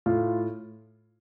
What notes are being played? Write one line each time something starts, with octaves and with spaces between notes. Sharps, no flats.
A2 F4